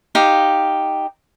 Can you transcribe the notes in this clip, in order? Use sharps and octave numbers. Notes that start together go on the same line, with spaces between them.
D#4 G4 F5